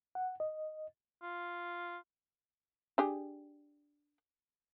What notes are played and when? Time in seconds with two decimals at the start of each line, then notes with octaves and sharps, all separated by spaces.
0.15 F#5
0.40 D#5
1.22 F4
2.98 D4 G4 G#4